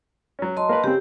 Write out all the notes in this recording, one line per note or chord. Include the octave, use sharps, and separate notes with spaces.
F#3 C#4
F#3 D#5 A5 C6
A#3 A#4 B4
C#3 C4 G4